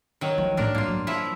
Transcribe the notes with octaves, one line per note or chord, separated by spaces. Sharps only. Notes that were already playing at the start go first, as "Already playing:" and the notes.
D#3 F#3
F3
A2 D3 D4 A#4
G1 A#3 F4
F#3
F3 E4 E5